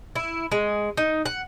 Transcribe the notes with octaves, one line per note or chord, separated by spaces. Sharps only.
E4
G#3
D#4
F#5